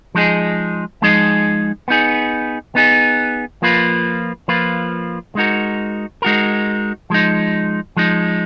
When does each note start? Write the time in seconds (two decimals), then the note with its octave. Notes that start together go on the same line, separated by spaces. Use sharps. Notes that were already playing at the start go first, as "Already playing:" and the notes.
0.15 F3 G#3 D#4 G#4 D#5
1.02 F3 G#3 D#4 G#4 D#5
1.88 B3 D#4 G#4
2.75 B3 D#4 G#4
3.62 F3 A#3 F4 B4
4.48 F3 A#3 F4 B4
5.35 G#3 D#4 F#4 A#4
6.22 G#3 D#4 F#4 A#4
7.10 F3 G#3 D#4
7.97 F3 G#3 D#4